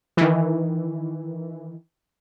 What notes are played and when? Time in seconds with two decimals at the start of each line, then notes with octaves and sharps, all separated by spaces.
0.17 D#3 E3